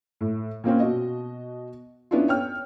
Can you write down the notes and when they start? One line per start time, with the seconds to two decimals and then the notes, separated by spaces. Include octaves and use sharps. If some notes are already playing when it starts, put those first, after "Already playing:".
0.21 A2
0.64 A#2 A#3 C4 C#4
0.80 B2 F#4 D#5
2.11 B3 C#4 D4 E4 F4
2.28 C#5 G5 F6